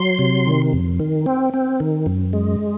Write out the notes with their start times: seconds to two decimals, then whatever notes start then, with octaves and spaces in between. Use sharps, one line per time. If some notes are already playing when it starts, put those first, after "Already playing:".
Already playing: F#3 C6
0.19 C3
0.46 D#3
0.73 F2
1.00 D#3
1.26 C4
1.54 C4
1.80 D#3
2.06 F#2
2.33 G#3